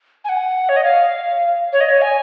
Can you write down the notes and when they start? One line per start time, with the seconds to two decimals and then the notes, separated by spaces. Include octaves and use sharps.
0.24 G#5
0.29 F#5
0.69 C#5
0.76 D#5
0.83 F5
1.72 C#5
1.80 D#5
1.89 C#5
2.01 G#5